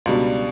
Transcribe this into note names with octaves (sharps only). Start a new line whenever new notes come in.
C#2 B2 G3 D4